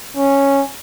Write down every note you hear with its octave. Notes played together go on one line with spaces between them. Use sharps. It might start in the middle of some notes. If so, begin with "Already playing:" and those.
C#4